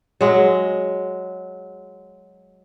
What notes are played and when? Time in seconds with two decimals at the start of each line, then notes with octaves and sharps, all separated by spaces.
0.21 F#3 G#3